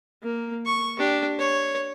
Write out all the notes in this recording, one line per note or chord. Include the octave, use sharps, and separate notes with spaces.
A#3
C#6
D4 G4
C#5